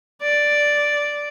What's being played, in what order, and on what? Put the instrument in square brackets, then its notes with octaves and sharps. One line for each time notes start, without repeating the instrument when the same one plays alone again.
[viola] D5